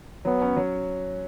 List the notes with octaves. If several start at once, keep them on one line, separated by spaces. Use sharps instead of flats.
F#3 B3
C#4
F#3